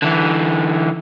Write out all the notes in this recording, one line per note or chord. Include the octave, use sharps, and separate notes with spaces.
D3 E3